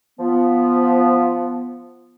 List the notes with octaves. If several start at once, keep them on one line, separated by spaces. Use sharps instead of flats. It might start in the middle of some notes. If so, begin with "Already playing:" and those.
F3 B3